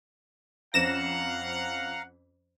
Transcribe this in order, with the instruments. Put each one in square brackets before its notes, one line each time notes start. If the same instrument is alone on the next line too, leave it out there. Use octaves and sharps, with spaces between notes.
[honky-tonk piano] F2 C4 C#4 [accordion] F5 A#5 [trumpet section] F#5 [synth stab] A#6 E7